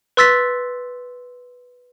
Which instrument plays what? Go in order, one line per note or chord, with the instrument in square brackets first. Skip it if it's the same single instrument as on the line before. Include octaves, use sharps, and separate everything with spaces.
[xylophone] B4 C6 E6 A6 B6